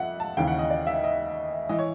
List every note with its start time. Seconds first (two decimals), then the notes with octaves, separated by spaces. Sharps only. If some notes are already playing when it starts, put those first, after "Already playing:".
Already playing: F2 E5 F#5
0.20 A5
0.37 D#2 C#3 E3 G5
0.47 F#5
0.59 D#5
0.70 D5
0.87 E5
1.04 D#5
1.69 E3 D#5
1.79 C#5